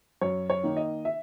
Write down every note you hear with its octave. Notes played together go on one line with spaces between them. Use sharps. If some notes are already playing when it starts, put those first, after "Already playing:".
F#2 C#5
C#5
D#3 A#3 D#4
D#5
E5